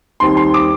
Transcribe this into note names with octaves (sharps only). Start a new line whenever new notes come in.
D#2 D#3 G3 C4 C6
C6
D6